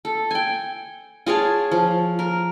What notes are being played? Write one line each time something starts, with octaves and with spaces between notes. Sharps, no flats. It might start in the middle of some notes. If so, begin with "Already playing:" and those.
A4
G5 G#5
F4 G#4 C#5 A5
F3
A#4